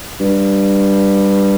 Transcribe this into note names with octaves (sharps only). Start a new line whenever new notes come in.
G2